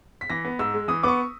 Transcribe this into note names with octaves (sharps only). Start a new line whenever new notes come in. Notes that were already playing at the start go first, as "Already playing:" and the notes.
B6
E3 A#6
B3
G#2 E6
G#3
E3 D#6
B3 C#6 D6